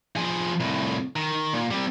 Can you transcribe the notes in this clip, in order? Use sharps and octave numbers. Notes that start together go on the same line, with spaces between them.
F3 G#4
C2 A2
D#3
A#2
G3 C4